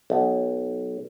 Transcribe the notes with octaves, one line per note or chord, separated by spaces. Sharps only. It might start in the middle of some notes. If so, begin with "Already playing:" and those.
B1